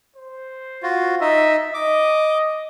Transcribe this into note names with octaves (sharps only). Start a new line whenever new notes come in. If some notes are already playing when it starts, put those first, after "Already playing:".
C5
F4 F#4
D#4 D#5 E5
D#5 D6